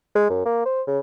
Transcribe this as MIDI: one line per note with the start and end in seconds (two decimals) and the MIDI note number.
0.15 0.27 56
0.29 0.45 42
0.46 0.62 58
0.66 0.82 72
0.87 0.99 49